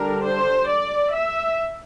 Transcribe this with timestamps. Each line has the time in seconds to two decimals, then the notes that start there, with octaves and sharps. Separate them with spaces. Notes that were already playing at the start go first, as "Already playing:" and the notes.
Already playing: D3 G3 D4 A#4
0.24 C5
0.69 D5
1.14 E5